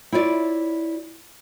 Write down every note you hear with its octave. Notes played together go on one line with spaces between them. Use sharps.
E4 F4 C#5 D5